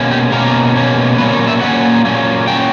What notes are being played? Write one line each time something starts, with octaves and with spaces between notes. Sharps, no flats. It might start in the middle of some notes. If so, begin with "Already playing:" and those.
Already playing: B2 A#3 C#4
G4
B2 A#3 C#4 A#4
B2 A#3 C#4
A#2 F#3 A#3 C#4 B4
C#5
E5
A#2 F#3 A#3 C#4 F#5
A#2 F#3 A#3 C#4
A#2 F#3 A#3 C#4 G5